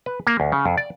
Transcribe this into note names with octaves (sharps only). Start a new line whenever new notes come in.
B4
A#3
D2
C#3
F2
D5